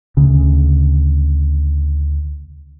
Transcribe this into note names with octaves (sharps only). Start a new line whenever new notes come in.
D2 C#3